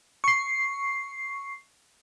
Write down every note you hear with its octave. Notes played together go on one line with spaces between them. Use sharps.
C#6 C7